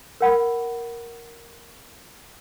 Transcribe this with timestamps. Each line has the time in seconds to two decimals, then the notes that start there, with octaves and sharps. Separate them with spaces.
0.21 A#4 F#5 B5